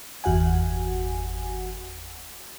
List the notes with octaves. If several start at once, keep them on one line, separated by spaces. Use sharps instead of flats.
G1 E2 F#4 F#5 G#5